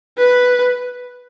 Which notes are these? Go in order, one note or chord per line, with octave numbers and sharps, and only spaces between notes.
B4